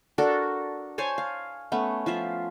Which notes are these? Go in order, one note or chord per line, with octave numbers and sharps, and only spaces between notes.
D4 F#4 A4 A#4
C5 C#5 G#5 A5
F5
A3 B3 C#4
F3 F4 E5